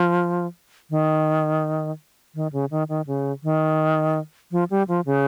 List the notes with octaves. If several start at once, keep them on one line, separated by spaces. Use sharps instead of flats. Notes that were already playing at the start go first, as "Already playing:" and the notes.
Already playing: F3
D#3
D#3
C#3
D#3
D#3
C#3
D#3
F3
G3
F3
C#3